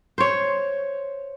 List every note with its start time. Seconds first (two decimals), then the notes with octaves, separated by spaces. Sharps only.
0.18 C5 C#5